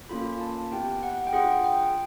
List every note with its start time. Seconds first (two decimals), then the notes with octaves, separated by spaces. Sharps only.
0.09 A#3 C#4 F4 A4 B5
0.41 A5
0.71 B3 E4 G4 G5
1.03 F#5
1.27 G5
1.33 D4 F4 G#4 F#5
1.64 G5